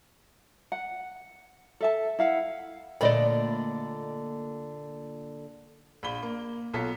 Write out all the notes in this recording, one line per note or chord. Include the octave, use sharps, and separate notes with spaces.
F#5
A4 E5 A5
E4 F5 F#5
A#2 D3 A3 D5 D#5 B5
A#1 B5 G7
A#3
B1 F4 A4 B6